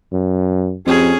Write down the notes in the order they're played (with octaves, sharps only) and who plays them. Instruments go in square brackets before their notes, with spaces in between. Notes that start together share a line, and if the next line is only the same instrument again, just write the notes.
[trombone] F#2
[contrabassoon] F2 [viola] C#4 G#4 [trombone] G4